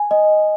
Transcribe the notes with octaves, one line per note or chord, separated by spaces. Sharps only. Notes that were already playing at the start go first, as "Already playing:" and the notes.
Already playing: G#5
D#5